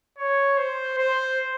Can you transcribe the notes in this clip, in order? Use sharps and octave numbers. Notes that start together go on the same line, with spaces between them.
C#5
C5
C5